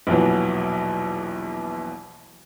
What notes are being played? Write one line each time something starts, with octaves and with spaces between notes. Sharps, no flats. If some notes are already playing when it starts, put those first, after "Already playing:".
A#1 E2 B2 E3 F#3